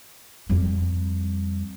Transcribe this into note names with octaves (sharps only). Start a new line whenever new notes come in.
F2 G3